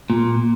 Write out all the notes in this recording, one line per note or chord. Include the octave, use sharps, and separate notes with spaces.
A#2